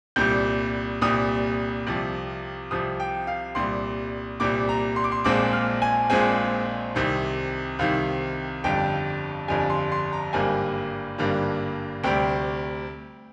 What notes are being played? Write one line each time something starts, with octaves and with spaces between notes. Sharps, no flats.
C2 A#2 G3 G6
C2 A#2 G3 D#6
C2 C3 F3
C2 C3 F3 D#6
G5
F5
C2 A#2 G3 C6
C2 A#2 G3 D6
A#5
C6
D6
C6
A#1 A#2 G#3 C4 D6
F6
G#5
A#1 A#2 G#3 C4 G#5
C2 C3 D#3
C2 C3 D#3 F5
G1 F2 D3 G3 G5
G1 F2 D3 G3 G#5
C6
C6
A#5
G#1 G2 D3 G3 A#3 G#5
G#1 G2 D3 G3 A#3
D2 C3 G3 G5